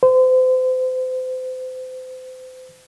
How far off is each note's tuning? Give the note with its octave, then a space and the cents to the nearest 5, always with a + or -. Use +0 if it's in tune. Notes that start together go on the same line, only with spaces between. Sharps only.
C5 -35